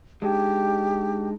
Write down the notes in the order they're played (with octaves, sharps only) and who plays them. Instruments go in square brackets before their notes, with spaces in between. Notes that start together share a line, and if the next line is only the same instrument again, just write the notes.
[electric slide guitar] G#3 D4 D#4 [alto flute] G4